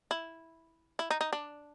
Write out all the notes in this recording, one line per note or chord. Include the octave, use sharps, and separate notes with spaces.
E4
E4
D#4
D#4
D4